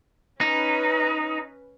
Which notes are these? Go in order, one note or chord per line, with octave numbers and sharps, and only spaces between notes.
C#4 D#4 B4